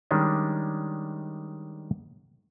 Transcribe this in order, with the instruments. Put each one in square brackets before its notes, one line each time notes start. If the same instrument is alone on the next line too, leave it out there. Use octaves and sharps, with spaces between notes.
[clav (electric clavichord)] D#3 G3 G#3 C#4 D4